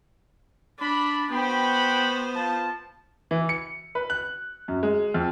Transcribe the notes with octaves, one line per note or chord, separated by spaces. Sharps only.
D4 B5
B3 F#4 C5 G5 B5
F3 A5
E3
C#7
B4
F#6
F#2
G#3
F2